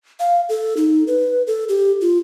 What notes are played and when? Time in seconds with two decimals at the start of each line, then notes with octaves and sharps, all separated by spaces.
0.20 F5
0.49 A4
0.77 D#4
1.07 B4
1.47 A4
1.69 G4
2.01 F4